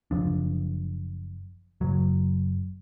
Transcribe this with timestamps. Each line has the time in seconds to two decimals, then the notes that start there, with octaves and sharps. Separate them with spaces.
0.11 F#1 F2 F3 D4
1.81 F#1 F#3